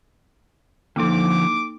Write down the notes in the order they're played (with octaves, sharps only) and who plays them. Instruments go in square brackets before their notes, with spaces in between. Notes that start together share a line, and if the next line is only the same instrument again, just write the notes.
[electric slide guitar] D3 E3 F3 [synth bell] A#3 D#4 [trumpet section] D6